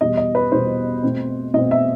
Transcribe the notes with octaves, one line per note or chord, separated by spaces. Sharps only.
E2 B2 G3 D#5
D#5
B4
E2 B2 G3 C5
B2 A3 C4
B2 A3 C4 D#5
E5